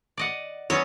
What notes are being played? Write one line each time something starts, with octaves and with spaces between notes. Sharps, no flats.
D5 D#5 F#5
F#3 B3 C#4 C#5